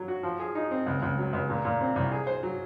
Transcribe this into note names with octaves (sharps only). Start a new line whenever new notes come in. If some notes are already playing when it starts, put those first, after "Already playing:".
Already playing: F#3
F#4
F3
G#4
D#4
C4
C#2
C#2
F#3
C#2
A#2
A#2
C4
C2
G#4
C5
F#3